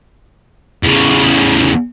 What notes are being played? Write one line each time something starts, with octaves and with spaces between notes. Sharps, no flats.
E2 C#3